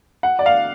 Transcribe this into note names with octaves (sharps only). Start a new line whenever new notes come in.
F#5
D5
F5